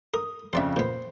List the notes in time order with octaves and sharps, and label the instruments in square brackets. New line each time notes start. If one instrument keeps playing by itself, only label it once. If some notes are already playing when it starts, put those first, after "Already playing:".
[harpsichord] A#4 [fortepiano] D#6
[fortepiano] F2 C#3 [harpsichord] C5 D5 E5
[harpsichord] A#2 B3 [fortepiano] C5